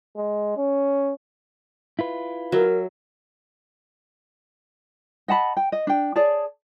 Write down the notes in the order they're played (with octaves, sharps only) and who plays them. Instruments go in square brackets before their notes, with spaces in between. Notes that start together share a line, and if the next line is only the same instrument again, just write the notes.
[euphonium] G#3
C#4
[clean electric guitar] E4 F4 B4
[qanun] F#3 E5 [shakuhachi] A#4
[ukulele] D#5 F#5 A5 B5
G5
D#5
D4 G5
G#4 C#5 D5 A5